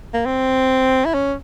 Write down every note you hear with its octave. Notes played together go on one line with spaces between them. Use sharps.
A#3
C4
E4
C#4